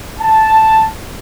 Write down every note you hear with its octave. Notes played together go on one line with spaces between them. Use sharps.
A5